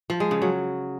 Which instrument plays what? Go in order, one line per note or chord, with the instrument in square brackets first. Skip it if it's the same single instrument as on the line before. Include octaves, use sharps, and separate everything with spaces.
[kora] F3
G#3
C#3
F#3